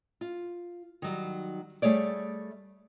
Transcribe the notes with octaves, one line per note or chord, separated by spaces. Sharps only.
F4
D#3 F#3 G3
G3 A3 G#4 C#5 D5